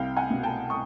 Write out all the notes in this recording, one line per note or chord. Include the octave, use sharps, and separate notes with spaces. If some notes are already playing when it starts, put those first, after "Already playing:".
Already playing: C2 F5 G5
F#5 G#5
B2
G5 A5
C#6 D#6